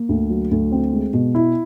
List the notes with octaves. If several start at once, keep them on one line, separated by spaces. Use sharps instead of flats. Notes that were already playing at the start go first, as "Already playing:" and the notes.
Already playing: A#3
D2
F#3
D2
C4
G#3
B2
E4